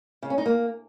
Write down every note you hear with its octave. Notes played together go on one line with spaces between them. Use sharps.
C#3
C#4
D#4
A#3